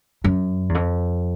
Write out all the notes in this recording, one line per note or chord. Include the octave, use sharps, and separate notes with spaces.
F#2
E2
F2